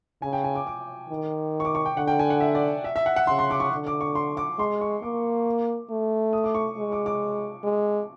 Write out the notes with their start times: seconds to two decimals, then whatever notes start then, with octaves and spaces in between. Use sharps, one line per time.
0.22 C#3 G#5
0.33 G5
0.44 G#5
0.55 D6
0.67 D6
1.09 D#3
1.60 C#6
1.65 D6
1.75 C#6
1.86 G5
1.97 D3 F#5
2.08 G5
2.19 G#5
2.30 F#5
2.40 E5
2.55 D5
2.84 E5
2.96 E5
3.06 F#5
3.16 F#5
3.27 C#3 C6
3.39 C6
3.50 D6
3.60 C#6
3.72 D3
3.87 D6
4.01 C#6
4.15 C6
4.37 D6
4.59 G#3 C6
4.81 C#6
5.02 A#3 D6
5.90 A3
6.33 D#6
6.44 D6
6.55 C#6
6.78 G#3
6.92 D6
7.06 D6
7.64 G#3